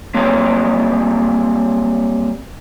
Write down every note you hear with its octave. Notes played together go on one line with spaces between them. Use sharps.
F#3 G3 A#3 C4